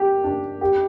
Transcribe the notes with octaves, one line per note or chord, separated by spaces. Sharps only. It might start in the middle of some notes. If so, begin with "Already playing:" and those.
Already playing: G4
D4
G4